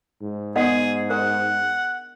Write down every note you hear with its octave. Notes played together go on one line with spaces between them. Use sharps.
G#2
B3 D#4 G#4 A#4 D#5 F#5
D4 A#4 F#5